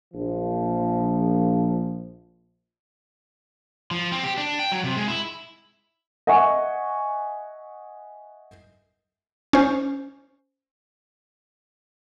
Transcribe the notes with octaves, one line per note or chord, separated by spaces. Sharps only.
A#1 F3
F3
C4
G4
D4
G5
F#3
C3
G#3
E4
D#5 E5 F#5 G#5 C#6
C#4 C5